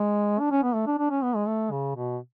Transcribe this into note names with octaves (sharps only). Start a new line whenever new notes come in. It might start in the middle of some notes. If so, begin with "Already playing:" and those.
Already playing: G#3
D4
C#4
B3
A3
D4
D4
C#4
B3
G#3
A3
C#3
B2